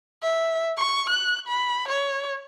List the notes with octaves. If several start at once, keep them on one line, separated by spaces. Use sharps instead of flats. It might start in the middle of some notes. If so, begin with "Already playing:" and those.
E5
C#6
F#6
B5
C#5